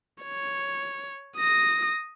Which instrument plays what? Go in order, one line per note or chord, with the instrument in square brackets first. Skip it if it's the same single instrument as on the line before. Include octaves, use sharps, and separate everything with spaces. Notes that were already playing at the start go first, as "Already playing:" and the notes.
[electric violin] C#5
D#6 A#6